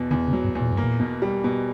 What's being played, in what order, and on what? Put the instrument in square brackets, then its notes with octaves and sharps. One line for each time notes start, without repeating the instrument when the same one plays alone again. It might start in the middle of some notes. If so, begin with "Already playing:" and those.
Already playing: [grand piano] E2 B2
[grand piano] E2 [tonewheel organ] D3
[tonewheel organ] C#3
[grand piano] F#3
[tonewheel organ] G2
[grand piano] E2
[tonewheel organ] A#2
[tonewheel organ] G2 [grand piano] A#3
[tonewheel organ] A#2
[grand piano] B2
G3
B2